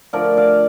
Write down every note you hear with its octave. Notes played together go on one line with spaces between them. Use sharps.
D3 F3 A3 A#4 D5
D5 F5